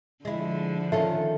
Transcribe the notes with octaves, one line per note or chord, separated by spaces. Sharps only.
D3 F3 G#3 E4
D#3 C#4 F4 A4 E5